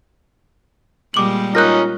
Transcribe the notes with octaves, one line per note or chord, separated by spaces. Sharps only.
A#2 G3 G#3 D6 F#7
C#4 D#4 F4 A#4 F#6 G6 A#6